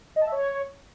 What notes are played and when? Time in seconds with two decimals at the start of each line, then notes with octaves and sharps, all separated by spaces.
0.16 D#5
0.21 A5
0.27 E5
0.32 C#5